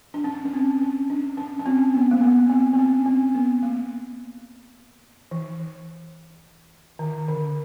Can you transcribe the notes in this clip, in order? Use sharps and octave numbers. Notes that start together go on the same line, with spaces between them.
D4
C#4
C#4
C4
C#4
D4
C#4
C#4
C4
B3
A#3
B3
C4
C4
C#4
C4
B3
A#3
E3
D#3
D3